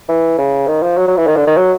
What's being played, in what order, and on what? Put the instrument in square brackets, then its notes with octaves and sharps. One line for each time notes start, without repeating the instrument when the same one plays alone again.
[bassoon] E3
C#3
D#3
F3
F#3
F#3
E3
D#3
D3
D#3
F#3